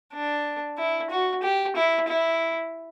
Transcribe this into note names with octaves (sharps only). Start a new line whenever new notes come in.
D4
E4
F#4
G4
E4
E4